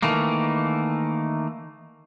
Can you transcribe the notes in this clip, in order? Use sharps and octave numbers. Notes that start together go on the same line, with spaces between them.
D#3 E3 A3 A#3